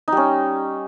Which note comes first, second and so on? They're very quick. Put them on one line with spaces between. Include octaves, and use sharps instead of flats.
D#4 G3 C#4